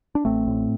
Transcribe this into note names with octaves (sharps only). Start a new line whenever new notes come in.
D4
A1 A3 C4
A2